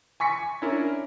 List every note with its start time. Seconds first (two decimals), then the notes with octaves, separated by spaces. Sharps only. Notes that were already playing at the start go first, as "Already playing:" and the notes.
0.20 G#5 C#6 B6 C#7
0.62 C#4 D4 E4 A#4